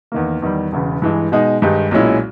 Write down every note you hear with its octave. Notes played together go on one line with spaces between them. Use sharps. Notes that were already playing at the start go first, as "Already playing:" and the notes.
E2 D#3 A#3
E2 D#3 G3
E1 E2 C#3
G2 E3 G#3
B2 G#3 D#4
G2 D#3 G#3 D#4 G4
B1 A#2 G#3 C#4 E4